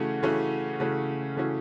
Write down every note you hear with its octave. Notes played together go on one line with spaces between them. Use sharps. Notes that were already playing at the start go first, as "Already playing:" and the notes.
Already playing: C#3 E3 A3 C#4 F#4
C#3 E3 A3 C#4 F#4
C#3 E3 A3 C#4 F#4
C#3 E3 A3 C#4 F#4